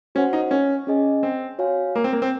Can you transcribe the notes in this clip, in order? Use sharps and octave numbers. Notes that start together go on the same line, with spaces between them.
C#4 F#4 C5 F#5
D#4
C#4
C#4 G#4 D#5 G#5
C4
F#4 C#5 F5 G#5
A#3
C4
A#3
C4